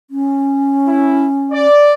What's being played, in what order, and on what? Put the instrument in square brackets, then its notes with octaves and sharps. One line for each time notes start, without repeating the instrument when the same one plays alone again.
[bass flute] C#4
[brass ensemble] E4
D5